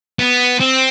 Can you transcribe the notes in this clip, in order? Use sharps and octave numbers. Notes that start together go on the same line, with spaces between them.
B3
C4